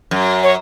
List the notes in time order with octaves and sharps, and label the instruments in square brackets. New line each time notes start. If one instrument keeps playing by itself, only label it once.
[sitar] F#2
[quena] C#5